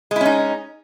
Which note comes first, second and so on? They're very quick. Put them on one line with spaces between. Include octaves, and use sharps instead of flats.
G#3 E4 C#4 D#4